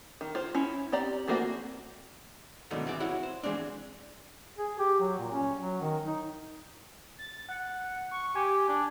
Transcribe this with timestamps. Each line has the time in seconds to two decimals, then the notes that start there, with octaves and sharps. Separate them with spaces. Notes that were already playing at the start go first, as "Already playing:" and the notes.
0.21 D#3
0.35 F4 C5
0.55 C#4 E4
0.92 C4 G4 D5 A#5
1.28 E3 A3 A#3 C4 F#4
2.71 G#2 B2 D3 D#3 F#3 A3
2.86 E3 C4 G#4 D5
3.00 E4 F#4 C#5 F#5
3.23 C5
3.43 E3 F3 G#3 C4 D4
4.58 G#4
4.79 G4
5.00 F#3
5.19 A#2
5.32 C#4
5.58 F#3
5.81 D#3
6.06 D#4
7.19 A6
7.49 F#5
8.11 C#6
8.36 G4 G#5
8.68 D4